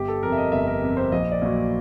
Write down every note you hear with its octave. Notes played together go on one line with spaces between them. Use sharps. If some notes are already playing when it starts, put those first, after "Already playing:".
Already playing: G1 G4
A4
F2 C3 A#4
E5
D#5
G1 E5
A#4
F2 C3
C5
A#1 D#5
D5
A#2 F#3